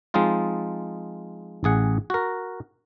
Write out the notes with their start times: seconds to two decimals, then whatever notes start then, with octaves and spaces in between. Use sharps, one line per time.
0.14 F3 G#3 C4 D#4 F4
1.64 A1 G#4 F#5
2.10 F#4 A#4